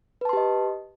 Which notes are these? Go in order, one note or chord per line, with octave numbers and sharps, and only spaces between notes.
G4 B4 D#5 A5 C6